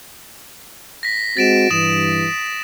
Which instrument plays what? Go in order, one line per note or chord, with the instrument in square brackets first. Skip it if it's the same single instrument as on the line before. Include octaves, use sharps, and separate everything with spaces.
[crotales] A#6 B6
[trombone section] G#3 C4 F#4 [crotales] A6 D7 E7
[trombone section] G2 E3 [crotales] D#6 E7